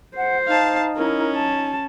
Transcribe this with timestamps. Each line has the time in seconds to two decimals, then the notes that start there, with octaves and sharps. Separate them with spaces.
0.17 C5 F#5
0.47 D#4 F5 A5
0.96 C#4 E4 A#4
1.36 A5